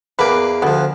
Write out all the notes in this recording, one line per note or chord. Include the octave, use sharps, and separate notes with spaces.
E2 A#3 B4 D6
D2 F3 B3